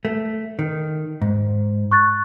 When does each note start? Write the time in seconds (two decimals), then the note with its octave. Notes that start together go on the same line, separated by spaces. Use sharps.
0.05 A3
0.59 D#3
1.22 G#2
1.91 C#6 F#6 A6